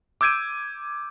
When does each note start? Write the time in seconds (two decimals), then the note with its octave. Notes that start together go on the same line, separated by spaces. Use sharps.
0.21 D6 E6 G6 G#6 D7 D#7